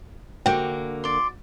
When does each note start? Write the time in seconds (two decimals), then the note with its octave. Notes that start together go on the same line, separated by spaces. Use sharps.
0.46 D3 A#3 F#4 G5
1.04 D5 C6